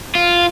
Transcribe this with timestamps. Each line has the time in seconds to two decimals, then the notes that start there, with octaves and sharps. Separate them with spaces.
0.15 F4